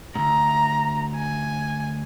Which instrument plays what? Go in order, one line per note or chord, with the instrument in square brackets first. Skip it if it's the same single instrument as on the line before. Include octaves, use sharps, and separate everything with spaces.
[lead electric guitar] D2 G#2 [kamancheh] A#5
[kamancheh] G#5